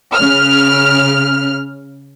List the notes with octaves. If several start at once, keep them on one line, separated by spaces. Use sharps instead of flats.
C#3 F6